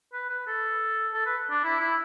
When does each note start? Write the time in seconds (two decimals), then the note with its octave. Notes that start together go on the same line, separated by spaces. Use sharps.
0.13 B4
0.30 B4
0.47 A4
1.14 A4
1.26 B4
1.51 D4
1.64 E4
1.80 E4